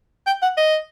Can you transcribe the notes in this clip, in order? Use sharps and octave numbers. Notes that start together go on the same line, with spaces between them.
G5
F#5
D#5